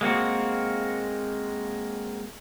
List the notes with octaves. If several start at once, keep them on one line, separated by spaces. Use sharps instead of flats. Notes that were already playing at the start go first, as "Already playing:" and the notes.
G#3 A#3 C4 F#4